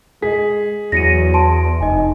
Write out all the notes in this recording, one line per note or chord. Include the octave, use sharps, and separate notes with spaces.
G#3 G#4 D#5 B6
E2 F#3 A#6 C#7 D#7
A5 C6 D7
F1 D#4 D#5 G#5